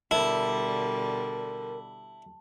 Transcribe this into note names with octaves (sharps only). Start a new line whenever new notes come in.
B2 D3 G3 E4 A#4 A5